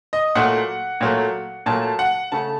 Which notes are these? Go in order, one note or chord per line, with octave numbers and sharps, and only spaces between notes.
D#5
A#2 F#3 A3 F#5
A#2 F#3 A3
A#2 F#3 A3 A5
F#5
C#3 A3 A5